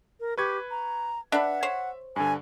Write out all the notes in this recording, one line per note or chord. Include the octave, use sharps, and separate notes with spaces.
A#4
G4 B4 C#6 G#6
A#5
D4 B4 E5 F#5
C5 C#5
G2 D3 G#5